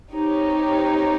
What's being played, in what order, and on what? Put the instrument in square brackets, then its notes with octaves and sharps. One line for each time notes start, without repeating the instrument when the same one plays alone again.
[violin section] C4 D#4 G4 C#5